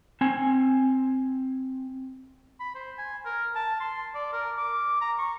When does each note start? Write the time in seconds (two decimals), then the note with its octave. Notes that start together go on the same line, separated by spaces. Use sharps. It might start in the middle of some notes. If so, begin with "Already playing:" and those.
0.21 C4 G#5
2.60 B5
2.75 C5
2.98 G#5
3.25 A#4
3.55 A5
3.80 C6
4.14 D5
4.33 A#4
4.57 D6
5.01 A#5
5.18 C#6